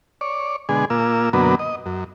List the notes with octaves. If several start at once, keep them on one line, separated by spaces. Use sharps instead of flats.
C#5 D5
B2 D3 G#3 G#4
A#2 A#3 F4 E6
F#2 B2 D3 F#3 A#3 B3
D#5
F#2